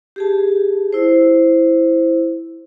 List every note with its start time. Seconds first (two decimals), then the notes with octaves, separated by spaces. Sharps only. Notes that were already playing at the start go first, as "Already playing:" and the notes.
0.16 G4 G#4 A5
0.93 E4 C5